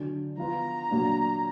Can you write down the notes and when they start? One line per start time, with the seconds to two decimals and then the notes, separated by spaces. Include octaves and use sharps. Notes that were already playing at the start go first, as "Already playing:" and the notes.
Already playing: D3 F#3 D4
0.37 F3 B3 F4 B4 A#5
0.90 A#2 F#3 A#3 D4